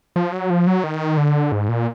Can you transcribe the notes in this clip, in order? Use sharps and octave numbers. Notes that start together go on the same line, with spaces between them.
F3
F#3
F3
F#3
D#3
D3
G#2
A#2